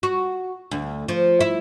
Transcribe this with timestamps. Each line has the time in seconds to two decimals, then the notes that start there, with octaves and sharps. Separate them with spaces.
0.03 F#4
0.71 D2
1.08 F3
1.41 E4